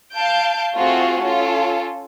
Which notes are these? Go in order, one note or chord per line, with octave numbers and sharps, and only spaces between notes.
F5 A5 G6 D7
A3 C4 F4 F#4 G#4
C#4 F4 A4